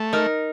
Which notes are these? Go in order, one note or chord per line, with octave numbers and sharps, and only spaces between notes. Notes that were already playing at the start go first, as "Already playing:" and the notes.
Already playing: A3
D#4 A#4